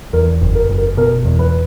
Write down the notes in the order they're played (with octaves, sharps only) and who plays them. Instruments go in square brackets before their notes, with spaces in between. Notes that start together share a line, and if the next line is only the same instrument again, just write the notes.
[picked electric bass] E2 [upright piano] A#4
[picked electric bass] F#1
[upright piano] A#4
[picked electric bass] F#1
[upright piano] A#4
[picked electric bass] B2 [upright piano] A#4
[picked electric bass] E2
[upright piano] B4